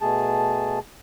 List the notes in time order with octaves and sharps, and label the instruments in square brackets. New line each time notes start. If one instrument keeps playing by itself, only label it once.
[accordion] B2 A3 G#4 A5